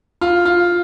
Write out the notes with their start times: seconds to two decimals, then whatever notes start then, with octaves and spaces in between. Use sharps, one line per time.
0.21 F4
0.45 F4